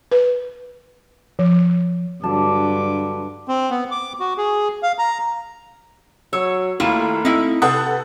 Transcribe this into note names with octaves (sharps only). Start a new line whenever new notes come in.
B4
F3
G2 D3 F#3 A5 D6
C4
B3
D6
F#4
G#4
F5
A#5
F#3 C#5 E6
D#2 A3 A#3 E4 F4
C4 D#4 E4
C3 A4 B4 F#5 D#6